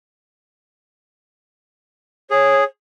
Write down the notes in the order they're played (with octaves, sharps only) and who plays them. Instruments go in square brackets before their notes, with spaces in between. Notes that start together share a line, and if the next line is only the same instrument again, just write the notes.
[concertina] G#4 [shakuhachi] C#5